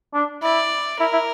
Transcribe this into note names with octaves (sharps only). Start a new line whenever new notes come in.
D4
E4 D5
E4 A#4
E4